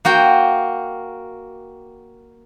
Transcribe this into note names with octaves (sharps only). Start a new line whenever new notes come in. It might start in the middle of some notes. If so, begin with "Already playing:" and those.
A#3 F#4 G5